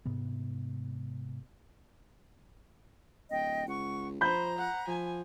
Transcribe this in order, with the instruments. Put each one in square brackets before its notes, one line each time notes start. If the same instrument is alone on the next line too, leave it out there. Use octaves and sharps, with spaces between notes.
[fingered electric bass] G#2 C3 B3
[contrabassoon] D1 [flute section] D#5 G5
[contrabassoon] C#2 [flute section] F#5 C#6
[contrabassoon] F3 [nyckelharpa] C5 [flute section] A#5 [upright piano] B5 G6
[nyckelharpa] F#5
[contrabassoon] F3 [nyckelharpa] G#5